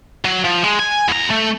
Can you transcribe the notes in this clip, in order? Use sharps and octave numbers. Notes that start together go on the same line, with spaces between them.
F#3
F3
G#3
G#5
E2 A#5
A3